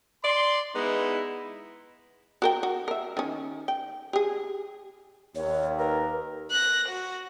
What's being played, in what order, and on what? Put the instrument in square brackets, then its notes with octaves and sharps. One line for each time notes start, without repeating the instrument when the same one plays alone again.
[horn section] D5 C6
G#3 B3 D#4 E4
[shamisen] F#4 A#4 G5
F#4
A#4 E5
D#3 C#4
G5
G4 G#4
[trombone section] D#2 [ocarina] C#5
[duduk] A#4 [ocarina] B4
[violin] F#6 A#6
F#4